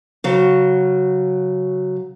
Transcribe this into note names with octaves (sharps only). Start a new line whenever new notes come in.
C#3 F#3